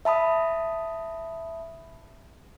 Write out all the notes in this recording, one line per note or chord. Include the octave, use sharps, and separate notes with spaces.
E5 A5 B5 D#6